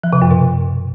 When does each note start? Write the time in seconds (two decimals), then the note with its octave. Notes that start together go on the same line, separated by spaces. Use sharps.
0.04 F3
0.13 C3
0.22 F#2
0.31 B2